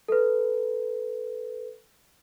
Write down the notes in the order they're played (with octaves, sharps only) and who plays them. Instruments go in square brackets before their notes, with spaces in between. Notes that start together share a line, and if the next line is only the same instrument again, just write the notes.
[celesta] A4 B4